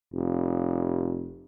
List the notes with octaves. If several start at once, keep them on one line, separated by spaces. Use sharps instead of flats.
F1